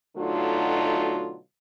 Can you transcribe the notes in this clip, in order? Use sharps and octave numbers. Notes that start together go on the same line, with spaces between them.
B2 D3 F#3 A3 D#4 F4